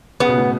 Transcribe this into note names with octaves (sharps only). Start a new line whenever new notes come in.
C#3 B3
B2
A2